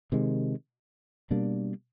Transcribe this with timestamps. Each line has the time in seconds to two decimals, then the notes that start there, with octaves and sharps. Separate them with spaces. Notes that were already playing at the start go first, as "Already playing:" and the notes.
0.12 C3 D#3 G#3
1.30 B2 G3 A#3 D4